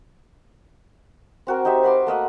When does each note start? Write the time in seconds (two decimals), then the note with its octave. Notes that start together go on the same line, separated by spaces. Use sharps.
1.47 C4 F#4 A#4
1.65 D#4 G4 C5 E5
1.83 F#4 B4 C6 D6
2.07 A3 A#3 D#5 F#5